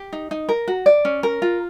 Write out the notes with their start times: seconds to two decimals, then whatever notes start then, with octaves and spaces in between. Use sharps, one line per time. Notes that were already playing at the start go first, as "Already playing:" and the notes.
Already playing: G4
0.13 D#4
0.31 D#4
0.49 A#4
0.68 F#4
0.86 D5
1.05 C#4
1.23 A#4
1.42 F4